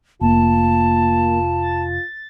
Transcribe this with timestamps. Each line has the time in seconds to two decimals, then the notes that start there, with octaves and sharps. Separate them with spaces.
0.21 F1 A#3 F4 A5
1.62 A6